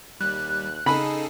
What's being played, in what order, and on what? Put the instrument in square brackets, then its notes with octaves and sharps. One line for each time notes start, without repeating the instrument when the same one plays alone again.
[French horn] D#2 [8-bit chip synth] G3 [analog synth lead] F#6
[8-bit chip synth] C#3 G#4 A4 [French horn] D#4 [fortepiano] B5